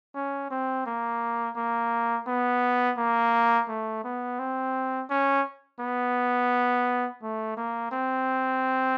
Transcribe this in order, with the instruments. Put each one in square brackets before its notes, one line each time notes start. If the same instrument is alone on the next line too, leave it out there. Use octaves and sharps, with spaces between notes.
[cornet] C#4
C4
A#3
A#3
B3
A#3
A3
B3
C4
C#4
B3
A3
A#3
C4